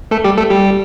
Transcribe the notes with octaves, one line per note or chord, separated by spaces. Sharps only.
A3 A4
G3 G4
A3 A4
G3 G4